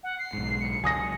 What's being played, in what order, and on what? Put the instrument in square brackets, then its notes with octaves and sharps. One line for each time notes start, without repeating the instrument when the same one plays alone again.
[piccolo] F#5
C7
[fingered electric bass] B1 G#2
[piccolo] C#7
[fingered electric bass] C#2 F#3 [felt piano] G#5 D#6 A#6